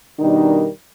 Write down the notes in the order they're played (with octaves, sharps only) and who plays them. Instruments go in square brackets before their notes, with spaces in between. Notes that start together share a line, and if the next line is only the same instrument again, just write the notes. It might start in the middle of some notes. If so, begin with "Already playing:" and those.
[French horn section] B2 D#3 G3 D4 D#4 A#4